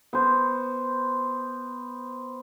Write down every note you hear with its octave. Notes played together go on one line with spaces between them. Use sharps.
B3 C5